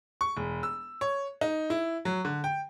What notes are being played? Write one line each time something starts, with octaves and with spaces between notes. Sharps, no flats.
C#6
E1
E6
C#5
D#4
E4
F#3
D3
G5